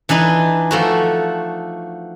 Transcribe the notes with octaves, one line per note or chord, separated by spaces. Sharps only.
E3 D4 D#4 B4
F3 A3 F#4